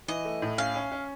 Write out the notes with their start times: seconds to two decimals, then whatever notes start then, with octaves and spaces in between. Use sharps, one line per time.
0.08 E3 D#5
0.25 A3
0.42 A2
0.58 C#4 F5
0.75 C#4
0.92 C#4